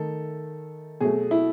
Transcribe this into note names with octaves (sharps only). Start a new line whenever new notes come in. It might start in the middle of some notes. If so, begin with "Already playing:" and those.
Already playing: D#3 A3 A4
B2 F#3 A3 G#4
E4